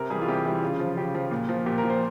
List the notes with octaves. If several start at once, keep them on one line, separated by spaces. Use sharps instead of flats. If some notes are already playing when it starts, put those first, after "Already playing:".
Already playing: C3 A#4
E3 G3 G#4
F4
C3 G4
E3 G3
C#3 F4
F3
C#3 G4
F3
A#2
F3
A#2 G4
A#4
F3
C5